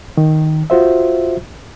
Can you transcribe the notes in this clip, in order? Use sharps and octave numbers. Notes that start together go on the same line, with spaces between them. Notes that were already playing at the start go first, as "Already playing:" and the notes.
D#3
F4 F#4 C5 E5